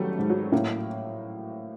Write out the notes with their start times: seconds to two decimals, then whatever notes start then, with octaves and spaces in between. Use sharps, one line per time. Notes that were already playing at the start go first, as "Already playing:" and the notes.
Already playing: A1 D#3 F#3 G3 A3
0.19 G#2
0.30 F#3
0.52 A2 A#3